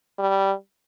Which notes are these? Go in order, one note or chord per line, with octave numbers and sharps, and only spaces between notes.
G3